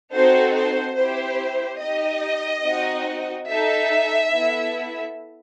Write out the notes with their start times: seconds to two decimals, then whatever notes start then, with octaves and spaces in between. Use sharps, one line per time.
0.14 C4 D#4 F#4 A4 C5
0.54 C5
0.96 C4 E4 G4 C5
1.80 D#4 G4 D#5
2.65 C4 D#4 F#4
3.48 D#4 A4 E5
4.33 B3 E4 A4